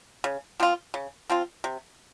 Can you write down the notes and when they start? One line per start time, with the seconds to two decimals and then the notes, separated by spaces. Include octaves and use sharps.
0.24 C#3
0.60 F3 C4 F4
0.94 C#3
1.30 F3 C4 F4
1.64 C3